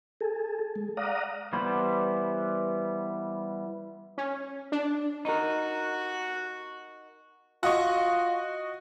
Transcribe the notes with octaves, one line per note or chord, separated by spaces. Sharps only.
G#4 A4
G#3
D5 F5 F#5 A#5 D#6
E3 G3 B3 C5 B5
C#4
D4
D#4 F#4 A#4
F4 F#4 D#5 C#6